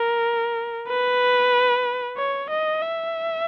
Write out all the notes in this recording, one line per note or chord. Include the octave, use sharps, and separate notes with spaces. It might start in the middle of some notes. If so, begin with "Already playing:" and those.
Already playing: A#4
B4
C#5
D#5
E5